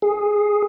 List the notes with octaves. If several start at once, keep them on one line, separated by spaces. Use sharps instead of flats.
G#4